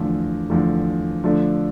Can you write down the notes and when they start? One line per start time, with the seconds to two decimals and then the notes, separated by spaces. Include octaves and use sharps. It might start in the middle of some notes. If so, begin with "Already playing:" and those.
Already playing: E2 D3 F3 A3
0.50 E2 D3 F3 A3
1.24 D3 F3 A3 D4 A4